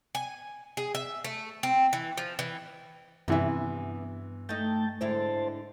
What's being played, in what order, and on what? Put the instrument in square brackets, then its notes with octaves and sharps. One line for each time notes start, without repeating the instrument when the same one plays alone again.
[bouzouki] G#5
G#4
E5
A3
C4
E3
F3
E3
[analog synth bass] G2 [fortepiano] C3 E3 [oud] B3 E5
[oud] A3 D#4 [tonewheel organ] G5 A5
[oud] G#2 D3 E4 [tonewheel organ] C5 A5